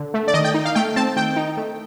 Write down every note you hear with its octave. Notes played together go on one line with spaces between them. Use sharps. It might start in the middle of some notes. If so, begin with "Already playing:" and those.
Already playing: D3
A3
D5
D#3 D#5
G5
D#4
F5
A3 G5
C4 A5
D#3 G5
D#4
A3